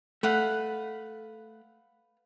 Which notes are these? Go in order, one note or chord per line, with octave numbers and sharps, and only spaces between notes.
A3 B4 F5 F#5